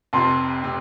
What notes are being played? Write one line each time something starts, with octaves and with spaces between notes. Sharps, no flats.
F1 F2 C3 A5 C6
C3